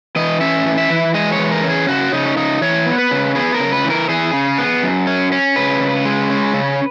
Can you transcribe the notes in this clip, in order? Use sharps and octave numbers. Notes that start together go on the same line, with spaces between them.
E3 D#5
C#4 E5
E3
E5
E3
G#3 D#5
C#5
E3
A#4
C#4
G#4
C#3 F#4
C#3 D#4
C#4
C#3 D#4
E3 C#5
B3
B4
C#3
B3 G#4
A#4
C#3
B4
E3
A#4
E3 G#4
C#3
B3
F#2
C#4
C#4
C#3 B4
C#3
G#3
C#4
C#3